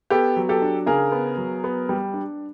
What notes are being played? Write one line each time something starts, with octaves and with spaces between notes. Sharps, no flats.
B3 G4 A4
F#3
G4 A4
D4
C#3 G#4 A#4
B3
F#3
B3
G3
D4